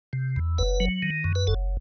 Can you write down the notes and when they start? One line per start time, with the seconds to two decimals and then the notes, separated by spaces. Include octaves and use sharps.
0.13 C3
0.36 E2
0.58 F#1 B4
0.80 F#3
1.02 D#3
1.24 F#2
1.35 B4
1.47 F#1 A4